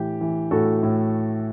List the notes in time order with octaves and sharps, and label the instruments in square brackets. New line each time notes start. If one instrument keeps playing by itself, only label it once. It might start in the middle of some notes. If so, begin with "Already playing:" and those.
Already playing: [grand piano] A2 E3 G4
E3
A2 F#4 A4
A2